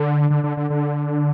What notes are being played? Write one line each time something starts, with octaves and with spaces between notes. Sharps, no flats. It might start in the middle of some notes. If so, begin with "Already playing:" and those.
Already playing: D3
D3
D3
D3
D3